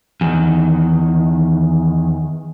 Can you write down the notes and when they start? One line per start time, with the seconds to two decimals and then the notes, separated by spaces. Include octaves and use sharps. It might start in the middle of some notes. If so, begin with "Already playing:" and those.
0.21 E2 D#3